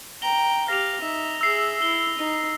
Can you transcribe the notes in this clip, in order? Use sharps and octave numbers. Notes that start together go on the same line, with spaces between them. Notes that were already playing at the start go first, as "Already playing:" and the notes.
G5 A#5 G7
G4 F5 A#6 F7
D#4 E5
G#4 E5 E6 C7
E4 G7
D#4